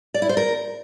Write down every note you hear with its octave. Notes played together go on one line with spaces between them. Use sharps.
D5
E4
C5
A#4